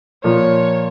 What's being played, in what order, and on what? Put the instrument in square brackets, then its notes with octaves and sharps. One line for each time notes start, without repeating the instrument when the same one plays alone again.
[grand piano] A#2 F3 A#3 [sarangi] C#5